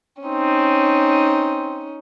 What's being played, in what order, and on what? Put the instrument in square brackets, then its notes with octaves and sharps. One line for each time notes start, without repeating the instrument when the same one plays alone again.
[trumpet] C4 [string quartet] C#4 D#4